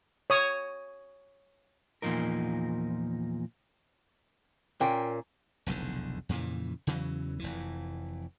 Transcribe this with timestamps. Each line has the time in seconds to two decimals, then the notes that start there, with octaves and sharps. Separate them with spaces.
0.30 C#5 D#6
2.02 E2 A#2 D3 F3 D#4 A#4
4.81 A#2 A#3 C#4 G5
5.66 F1 B1 E2 D3
6.29 F2 A#2 C#3 E3
6.87 E2 C#3 E3 F#3
7.39 F1 F2 E3